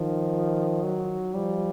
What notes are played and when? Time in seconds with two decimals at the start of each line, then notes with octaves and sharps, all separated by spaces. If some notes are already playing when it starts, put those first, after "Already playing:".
Already playing: D#3 F3
0.83 F#3
1.34 F3 G3